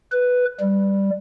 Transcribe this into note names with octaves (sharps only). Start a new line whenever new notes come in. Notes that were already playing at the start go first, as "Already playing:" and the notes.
B4
G3